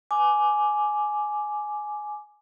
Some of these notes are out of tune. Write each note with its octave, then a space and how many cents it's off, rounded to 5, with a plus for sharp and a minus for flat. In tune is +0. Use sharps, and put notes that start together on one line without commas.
G#5 +15 D6 +0